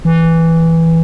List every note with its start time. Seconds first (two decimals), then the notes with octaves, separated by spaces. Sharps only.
0.05 E3